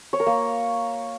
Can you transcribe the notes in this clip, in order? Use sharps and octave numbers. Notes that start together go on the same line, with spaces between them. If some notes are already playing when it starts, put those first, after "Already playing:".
C#5
A#4
A#3